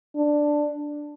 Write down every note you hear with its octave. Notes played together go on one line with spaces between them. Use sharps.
D4